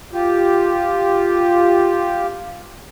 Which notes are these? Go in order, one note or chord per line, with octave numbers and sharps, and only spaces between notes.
F4 G4